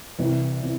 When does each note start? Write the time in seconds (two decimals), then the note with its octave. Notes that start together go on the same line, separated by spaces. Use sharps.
0.18 C2 C3 E3
0.63 C3 E3